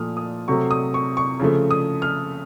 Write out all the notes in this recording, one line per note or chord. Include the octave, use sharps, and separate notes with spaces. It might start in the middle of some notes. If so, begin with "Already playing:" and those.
Already playing: A#2 F3 A3 D#6 F6
D#6
C3 F#3 A3 C#6
D#6
C#6
C#6
C#3 F3 A3
D#6
F6